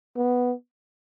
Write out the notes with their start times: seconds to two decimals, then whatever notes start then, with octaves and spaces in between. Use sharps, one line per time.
0.16 B3